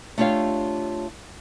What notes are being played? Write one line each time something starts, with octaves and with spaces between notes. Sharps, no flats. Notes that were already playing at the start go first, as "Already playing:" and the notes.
A3 D4 F4 G4 C#5 F5